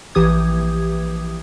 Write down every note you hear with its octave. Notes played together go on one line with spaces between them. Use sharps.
A#1 E3 G4 D#6 G#6